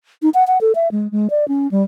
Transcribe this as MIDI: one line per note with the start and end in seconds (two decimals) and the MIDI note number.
0.22 0.29 63
0.34 0.44 78
0.47 0.58 78
0.61 0.72 69
0.75 0.88 76
0.92 1.10 56
1.12 1.28 56
1.30 1.48 74
1.48 1.70 61
1.71 1.84 55